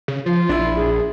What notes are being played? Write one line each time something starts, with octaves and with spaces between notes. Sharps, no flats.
C#3
F3 F4
A#1 D4 E4
G#4